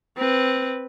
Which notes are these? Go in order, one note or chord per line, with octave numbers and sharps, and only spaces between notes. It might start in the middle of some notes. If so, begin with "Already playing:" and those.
C4 B4